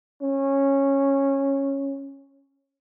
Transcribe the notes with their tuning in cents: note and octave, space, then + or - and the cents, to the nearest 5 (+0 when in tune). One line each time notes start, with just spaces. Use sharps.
C#4 -10